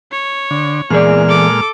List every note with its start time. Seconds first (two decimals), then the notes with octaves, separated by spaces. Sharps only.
0.12 C#5
0.51 D3
0.90 E2 A#2 G#3 G#4 D5 F6
1.28 A4 D6